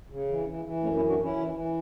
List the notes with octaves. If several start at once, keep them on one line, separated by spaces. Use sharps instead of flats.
C#3
E3
E3
E3
F#2 A3 C#4
C#4 E4
E3
D4 F#4
E3 C#4 E4
E3
E3